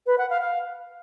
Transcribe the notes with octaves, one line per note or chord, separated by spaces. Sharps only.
B4
F#5
F5
F5